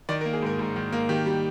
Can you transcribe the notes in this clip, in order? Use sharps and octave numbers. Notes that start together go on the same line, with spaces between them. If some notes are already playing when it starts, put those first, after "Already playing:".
D#3 D5
A#4
A#3
G#4
G#2 A#4
G#2
D#3
A#3
D#3 G4
G3